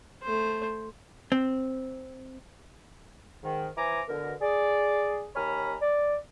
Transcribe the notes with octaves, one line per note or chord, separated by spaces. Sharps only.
A3 C5
C4
G#2 D#3
E3 E4 C5 G#5 A#5 D6
B2 D3 A#4
G#4 D5
D#2 C#5 G#5 A#5 B5 F6
D5